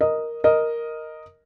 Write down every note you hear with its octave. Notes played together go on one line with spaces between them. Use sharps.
A#4 D#5
A#4 D#5